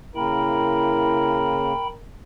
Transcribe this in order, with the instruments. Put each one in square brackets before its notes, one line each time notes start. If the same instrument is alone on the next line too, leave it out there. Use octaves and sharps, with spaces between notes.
[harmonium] C#3 A#3 [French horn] E4 [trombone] A#4 [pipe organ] G5 B5